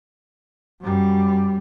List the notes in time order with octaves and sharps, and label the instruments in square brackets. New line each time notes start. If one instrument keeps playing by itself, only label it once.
[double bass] F#2 G3